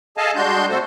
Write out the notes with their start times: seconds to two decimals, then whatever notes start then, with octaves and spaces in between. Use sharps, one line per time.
0.17 G#4 A4 D#5 F5 G#5 A5
0.36 G3 G#3 D4 F#4 C6 G6
0.69 C3 A3 F#4 A4 C5